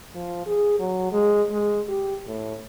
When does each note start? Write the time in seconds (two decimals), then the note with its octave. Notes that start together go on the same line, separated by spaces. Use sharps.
0.15 F3
0.46 G#4
0.79 F#3
1.12 G#3
1.52 G#3
1.89 G4
2.27 A2